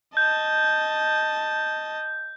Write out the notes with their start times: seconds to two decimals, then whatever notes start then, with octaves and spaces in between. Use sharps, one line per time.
0.17 D#5 A5 G6